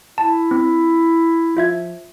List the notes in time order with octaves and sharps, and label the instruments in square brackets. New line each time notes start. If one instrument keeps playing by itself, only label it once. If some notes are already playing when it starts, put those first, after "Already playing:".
[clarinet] E4 [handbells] A5
[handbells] C4
[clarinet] F3 [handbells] F4 E5 G#6